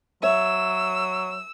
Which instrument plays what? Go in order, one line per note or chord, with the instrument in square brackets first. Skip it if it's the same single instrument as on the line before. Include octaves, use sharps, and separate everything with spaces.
[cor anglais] F#3 [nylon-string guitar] C#5 E5 [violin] E6